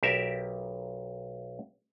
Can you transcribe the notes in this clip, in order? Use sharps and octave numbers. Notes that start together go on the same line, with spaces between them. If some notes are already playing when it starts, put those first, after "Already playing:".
B1 G4 A#4 E5